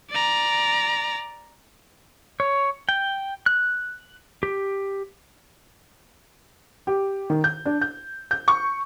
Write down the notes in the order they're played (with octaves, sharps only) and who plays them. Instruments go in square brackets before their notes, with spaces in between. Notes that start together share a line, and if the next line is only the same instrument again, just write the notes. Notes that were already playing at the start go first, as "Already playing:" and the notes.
[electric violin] D5 A#5
[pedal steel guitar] C#5
G5
F#6
G4
[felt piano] G4
D#3
G6
D4
G6
G6
C#6